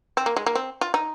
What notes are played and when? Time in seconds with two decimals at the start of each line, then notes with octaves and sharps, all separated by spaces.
0.17 C4
0.26 A#3
0.36 G#3
0.46 A#3
0.55 C4
0.81 F4
0.94 D#4